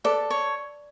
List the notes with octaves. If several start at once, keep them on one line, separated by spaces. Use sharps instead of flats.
A4 B4 D5
C#5